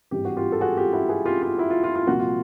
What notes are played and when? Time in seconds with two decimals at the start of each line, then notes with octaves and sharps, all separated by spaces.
0.11 G#1 G2 E3 G#3 G4
0.25 F#4
0.37 F4 G4
0.52 A4
0.61 F#4 G#4
0.77 F4 G4
0.93 E4 F#4
1.09 F#4 G#4
1.26 F4 G4
1.42 F4
1.58 E4 F#4
1.70 F4
1.84 F4
1.96 F4
2.07 C2 A#2 F3 A#3 F#4
2.20 F4